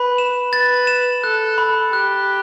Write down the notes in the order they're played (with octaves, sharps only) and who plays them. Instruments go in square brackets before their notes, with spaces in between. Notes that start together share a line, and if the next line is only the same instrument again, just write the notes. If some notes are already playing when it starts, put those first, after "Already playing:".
Already playing: [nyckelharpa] B4 [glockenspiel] B5
[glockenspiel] E7
[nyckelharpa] B4 [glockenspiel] A6
[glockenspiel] E7
[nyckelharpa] A4 [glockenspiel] F#6
[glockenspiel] B5
[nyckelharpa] G4 [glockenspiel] F#6